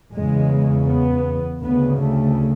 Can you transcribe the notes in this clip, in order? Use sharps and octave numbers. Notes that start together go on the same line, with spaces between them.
E2 C#3 G#3
B3
D2 C#3 B3
A3